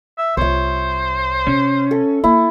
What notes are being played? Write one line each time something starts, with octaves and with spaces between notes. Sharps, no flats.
E5
C2 F4 C5 C#5 E5
C3 C#4
A4
A#3 E4